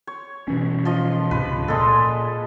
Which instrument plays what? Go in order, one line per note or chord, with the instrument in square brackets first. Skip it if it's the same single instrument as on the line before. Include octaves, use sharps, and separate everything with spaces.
[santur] C#5
[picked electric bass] B2 E3 C#4
[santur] F3 F4 D#5
[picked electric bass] C#2 G#2 C3 [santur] B4
[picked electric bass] A#2 [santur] G#3 A4